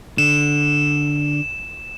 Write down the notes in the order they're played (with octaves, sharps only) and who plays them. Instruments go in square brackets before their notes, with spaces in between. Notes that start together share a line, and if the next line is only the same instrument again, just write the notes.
[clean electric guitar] D3 [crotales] E7